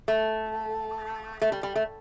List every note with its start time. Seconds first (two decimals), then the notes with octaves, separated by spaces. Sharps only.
0.08 A3
1.42 A3
1.52 G3
1.63 G3
1.76 A3